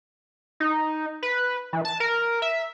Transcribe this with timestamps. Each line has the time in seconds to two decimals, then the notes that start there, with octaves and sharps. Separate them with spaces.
0.60 D#4
1.23 B4
1.73 E3
1.85 A5
2.00 A#4
2.42 E5